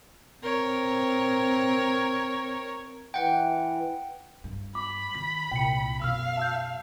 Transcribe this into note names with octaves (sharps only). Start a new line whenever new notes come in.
C4 A#4 C#5
E3 F#5 G5
G2
B5 D6
D#3 B6
C2 A#2 G5 C#7
F#2 B2 F5 E6 F6
A5 E6 G6